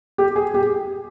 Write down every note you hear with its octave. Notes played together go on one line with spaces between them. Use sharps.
G4
G#4
G4